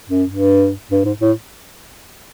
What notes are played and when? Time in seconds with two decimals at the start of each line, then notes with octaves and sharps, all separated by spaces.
0.09 F#2
0.29 G2
0.91 G2
1.05 G#2
1.21 A2